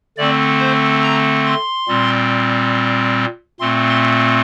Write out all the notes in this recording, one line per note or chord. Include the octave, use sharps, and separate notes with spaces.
D3 A3 C4 D5
C5
A#5
C6
A#2 G3 C4
A#2 A3 C4 C6
C6